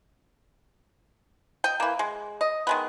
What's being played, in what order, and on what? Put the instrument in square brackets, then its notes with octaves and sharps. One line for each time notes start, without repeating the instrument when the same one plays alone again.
[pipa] D#5 G5
E3 A#3
G#3
D#5
D#3 G#3 B3